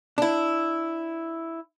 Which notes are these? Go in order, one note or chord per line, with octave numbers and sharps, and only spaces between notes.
D4 E4